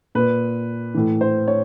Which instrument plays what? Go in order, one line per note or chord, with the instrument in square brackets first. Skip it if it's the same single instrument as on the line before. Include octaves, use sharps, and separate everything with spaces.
[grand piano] A#2 B4
A2 E3
C5
C#5